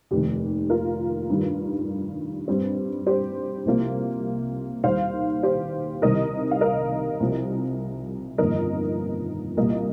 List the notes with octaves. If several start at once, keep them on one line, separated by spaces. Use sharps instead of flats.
F1 D#2 D#3 G4
F4 A#4
G2 D#3 G3
G2 G3 C4
G4 C5
C2 C3 F3 A#3
D#2 D#3 G3 C5 F5
G4 C5
C2 C3 D#3 G3 A#4 D#5
F5
A#4 D#5
C2 C3 F3
G1 F2 D#3 A#3 A#4 D#5
C2 A#2 G3 A#3 A#4 D#5